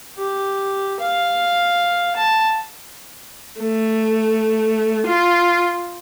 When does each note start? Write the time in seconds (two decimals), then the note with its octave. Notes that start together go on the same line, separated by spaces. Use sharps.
0.18 G4
1.00 F5
2.16 A5
3.61 A3
5.07 F4